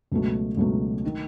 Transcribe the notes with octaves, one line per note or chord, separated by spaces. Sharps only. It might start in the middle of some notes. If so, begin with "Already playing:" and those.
C#2 B2 F#3 A3
C#2 B2 F#3 A3
D#3